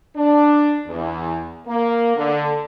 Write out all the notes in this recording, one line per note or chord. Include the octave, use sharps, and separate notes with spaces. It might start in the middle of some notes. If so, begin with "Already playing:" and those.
D4
E2
A#3
D3